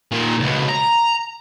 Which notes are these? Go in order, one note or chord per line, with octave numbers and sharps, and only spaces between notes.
A#2 D#3
C#2 B2
A#5